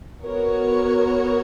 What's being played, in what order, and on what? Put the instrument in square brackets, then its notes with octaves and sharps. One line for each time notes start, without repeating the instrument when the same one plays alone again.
[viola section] B3 F#4 A#4 C#5